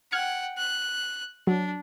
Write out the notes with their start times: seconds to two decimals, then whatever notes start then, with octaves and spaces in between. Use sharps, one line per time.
0.12 F#5 G5 F6 G#6 C#7
0.58 F#6
1.47 F#3 D4